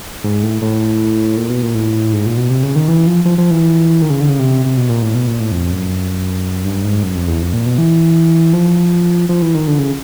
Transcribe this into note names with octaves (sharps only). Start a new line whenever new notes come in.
G#2
A2
A2
A#2
B2
A#2
A2
G#2
A#2
B2
C3
C#3
D#3
E3
F3
F3
F3
E3
D#3
C#3
D3
C#3
C3
C3
B2
A#2
A2
B2
A#2
A2
F2
F#2
G2
G#2
F#2
F2
E2
F2
A#2
B2
E3
F3
F3
E3
D#3
D3
C#3